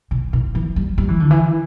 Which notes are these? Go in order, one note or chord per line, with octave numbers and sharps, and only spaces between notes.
B2
B2
E3
G3
G3
E3
D3
E3